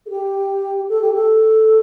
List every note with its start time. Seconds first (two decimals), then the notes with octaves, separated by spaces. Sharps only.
0.06 A4
0.10 G4
0.89 A4
1.01 G4
1.14 A4